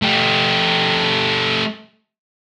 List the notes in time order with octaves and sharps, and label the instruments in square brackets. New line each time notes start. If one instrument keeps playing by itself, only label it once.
[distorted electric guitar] A3 G4